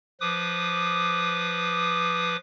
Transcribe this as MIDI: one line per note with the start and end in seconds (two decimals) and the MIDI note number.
0.21 2.36 53
0.21 2.36 71
0.21 2.36 86
0.21 2.36 87